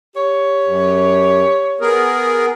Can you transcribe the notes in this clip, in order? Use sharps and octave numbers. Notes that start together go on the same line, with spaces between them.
G4 C#5
F#2
B3 G#4 A#4